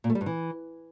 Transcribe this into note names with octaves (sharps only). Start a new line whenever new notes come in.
A#2
A3
G3
G2
E3